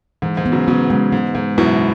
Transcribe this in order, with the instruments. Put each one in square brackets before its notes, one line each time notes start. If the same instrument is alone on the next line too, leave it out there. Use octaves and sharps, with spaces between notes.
[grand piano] G#2 [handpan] E3
[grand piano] G#2
[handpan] B3
[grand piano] C#3 F#3
[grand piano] C#3 F#3 [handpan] B3
[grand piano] G#2 C#3 [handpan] G#3
[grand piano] G#2 [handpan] G#3
[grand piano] G#2 [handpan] G#3
[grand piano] F#2 B2 [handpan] E4